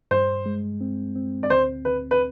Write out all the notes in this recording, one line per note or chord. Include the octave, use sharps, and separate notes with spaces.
G2 C5
G#3
C4
C4
D5
D2 C5
D2 B4
B4